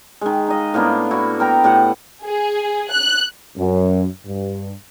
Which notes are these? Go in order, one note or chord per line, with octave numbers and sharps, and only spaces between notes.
D#3 G#3
D#4 D#5 F5
A2 A#3 B3 D4
E4 F#4
B3 A#4 G5 A#5
A2 G4 F#5
G#4
F#6
F#2
G2